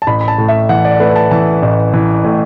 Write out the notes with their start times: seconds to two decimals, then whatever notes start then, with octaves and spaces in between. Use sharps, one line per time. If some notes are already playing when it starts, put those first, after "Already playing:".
0.02 A5
0.07 A1 B5
0.21 B5
0.28 A5
0.38 A2
0.49 E5
0.69 E3 F#5
0.85 D5
1.00 A3 B4
1.16 A5
1.31 E3 A5
1.63 A1
1.94 E3
2.24 A2